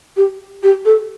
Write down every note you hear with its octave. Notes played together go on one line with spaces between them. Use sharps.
G4
G4
A4